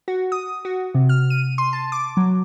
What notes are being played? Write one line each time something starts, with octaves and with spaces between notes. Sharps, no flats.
F#4
D#6
F#4
C3
F6
D#7
C6
A5
D6
F#3